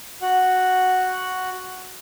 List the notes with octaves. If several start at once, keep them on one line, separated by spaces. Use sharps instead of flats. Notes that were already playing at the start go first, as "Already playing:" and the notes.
F#4 F#5